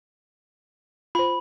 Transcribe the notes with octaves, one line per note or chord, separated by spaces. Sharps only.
F4 C5 B5